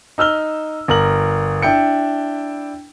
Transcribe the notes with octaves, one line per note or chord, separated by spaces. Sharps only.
D#4 E6 F6 G7
G1 A#4 F#7
D4 E4 G5 C#7